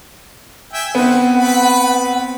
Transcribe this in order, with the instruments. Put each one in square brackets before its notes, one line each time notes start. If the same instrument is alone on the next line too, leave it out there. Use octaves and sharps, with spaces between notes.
[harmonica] E5 G5 G#5
[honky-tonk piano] B3 C4 [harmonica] B4 [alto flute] F#5
[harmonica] B4 B5